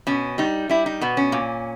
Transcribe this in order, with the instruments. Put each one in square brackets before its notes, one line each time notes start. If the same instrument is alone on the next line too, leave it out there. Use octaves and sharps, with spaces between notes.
[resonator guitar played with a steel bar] B2 C#4
G3 D#4
G3 E4
D#4
B2 B3
C#4
A#2